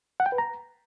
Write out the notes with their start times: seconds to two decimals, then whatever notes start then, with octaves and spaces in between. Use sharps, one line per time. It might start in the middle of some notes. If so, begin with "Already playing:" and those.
0.20 F#5
0.26 G5
0.32 B4
0.38 A#5